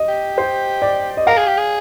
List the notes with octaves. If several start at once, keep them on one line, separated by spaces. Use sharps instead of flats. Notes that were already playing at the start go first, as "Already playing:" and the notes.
Already playing: D#5
G4
C5
D5
D#5
A#4 F5
G#4
G4
G#4